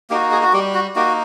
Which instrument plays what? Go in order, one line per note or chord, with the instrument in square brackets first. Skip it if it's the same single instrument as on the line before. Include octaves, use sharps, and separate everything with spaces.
[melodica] A#3 D#4 F#4 G4
G#4
F#4
G3 G4
F#4
A#3 D#4 F#4 G4